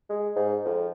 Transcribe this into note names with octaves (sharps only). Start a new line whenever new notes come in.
G#3
G#2
F2